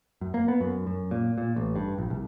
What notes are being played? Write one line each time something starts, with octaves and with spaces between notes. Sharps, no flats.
F#2
A#3
B3
F#2
F#2
A#2
A#2
A1
G2
A#1
C2